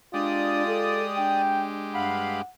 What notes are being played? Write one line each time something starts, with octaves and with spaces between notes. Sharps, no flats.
G#3 D4 F4 G4 D5 D#6
A4
D4 G5
G2 F5 F#5 B5